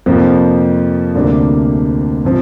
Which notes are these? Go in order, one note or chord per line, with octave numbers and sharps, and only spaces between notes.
F2 C3 F3 A#3
D2 C3 G3 A#3 D4
C3 F3